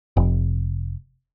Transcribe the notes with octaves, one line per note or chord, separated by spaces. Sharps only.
F1